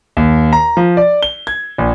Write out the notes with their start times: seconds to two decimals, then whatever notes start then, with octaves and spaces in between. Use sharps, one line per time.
0.17 D#2
0.53 A#5
0.77 F3
0.97 D5
1.23 G7
1.47 G#6
1.78 A#1